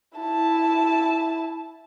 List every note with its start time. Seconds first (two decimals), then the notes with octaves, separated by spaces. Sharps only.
0.18 E4 A5